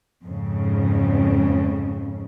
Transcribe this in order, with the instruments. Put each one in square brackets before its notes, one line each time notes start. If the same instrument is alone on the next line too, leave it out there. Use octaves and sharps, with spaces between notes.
[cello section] F2 G#2 C#3